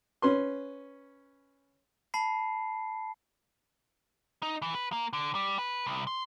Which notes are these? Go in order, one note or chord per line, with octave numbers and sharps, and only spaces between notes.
C#4 B4 C6
A5 B5 C7
D#4
E3
B4
A#3
D3
G3
B4
C2
C6